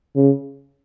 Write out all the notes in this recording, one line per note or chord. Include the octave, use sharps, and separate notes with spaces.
C#3